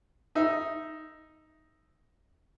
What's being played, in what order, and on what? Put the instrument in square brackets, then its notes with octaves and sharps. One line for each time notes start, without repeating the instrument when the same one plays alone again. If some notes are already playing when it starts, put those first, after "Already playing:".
[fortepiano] D#4 E5